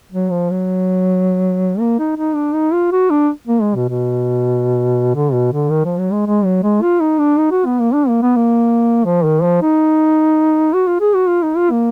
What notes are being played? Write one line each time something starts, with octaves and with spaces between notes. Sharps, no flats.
F#3
F3
F#3
A#3
D#4
D#4
D4
D#4
F4
F#4
D4
A#3
G#3
B2
B2
D3
B2
D3
D#3
F3
F#3
G#3
G#3
F#3
G#3
F4
D#4
D4
D#4
F#4
B3
A#3
D4
A#3
B3
A#3
F3
D#3
F3
D#4
F#4
F4
G#4
F#4
F4
D#4
F4
A#3